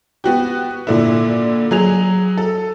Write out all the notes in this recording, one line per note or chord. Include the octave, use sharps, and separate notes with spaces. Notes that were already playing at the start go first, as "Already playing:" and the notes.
B3 F#4 G4
A#2 D3 E4
F#3 G#4 F7
A4